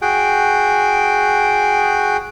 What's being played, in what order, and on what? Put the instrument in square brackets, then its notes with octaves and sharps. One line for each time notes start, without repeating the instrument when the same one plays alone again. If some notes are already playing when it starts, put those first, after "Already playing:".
[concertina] F#4 G#4 G5